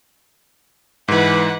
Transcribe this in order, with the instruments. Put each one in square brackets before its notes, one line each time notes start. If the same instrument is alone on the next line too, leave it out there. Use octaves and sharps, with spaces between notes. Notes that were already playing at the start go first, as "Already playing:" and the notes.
[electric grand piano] G#2 E3 [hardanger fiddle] B4 F#5